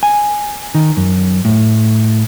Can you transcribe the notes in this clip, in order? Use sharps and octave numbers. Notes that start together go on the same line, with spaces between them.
G#5
D#3
F#2
A2